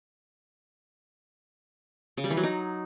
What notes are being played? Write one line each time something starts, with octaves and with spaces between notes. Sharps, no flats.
C#3
G3
E3
F#3
D#4